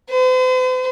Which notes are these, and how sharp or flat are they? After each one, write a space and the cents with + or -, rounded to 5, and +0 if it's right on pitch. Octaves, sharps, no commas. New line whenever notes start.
C5 -45